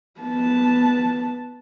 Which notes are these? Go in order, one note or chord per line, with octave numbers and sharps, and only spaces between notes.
B3 A5